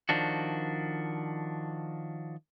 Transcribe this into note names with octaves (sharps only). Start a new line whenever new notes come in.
D#3 F3 D4 F#4